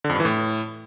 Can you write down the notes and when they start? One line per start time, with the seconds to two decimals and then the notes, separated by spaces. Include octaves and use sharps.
0.04 D3
0.10 F2
0.15 G2
0.20 E3
0.25 A2